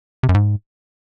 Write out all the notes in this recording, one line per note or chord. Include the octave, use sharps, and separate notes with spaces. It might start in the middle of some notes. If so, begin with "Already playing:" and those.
C3
F#2
G#2